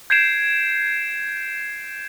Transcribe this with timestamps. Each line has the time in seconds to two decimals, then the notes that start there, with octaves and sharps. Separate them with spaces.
0.10 G6 G#6 C7 D7 E7